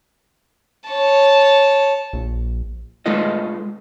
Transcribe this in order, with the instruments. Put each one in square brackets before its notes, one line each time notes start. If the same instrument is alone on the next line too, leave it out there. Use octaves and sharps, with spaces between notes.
[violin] C#5 A5
[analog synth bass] A#1
[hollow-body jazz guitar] G#3 A3 F4 A4 B4 D#5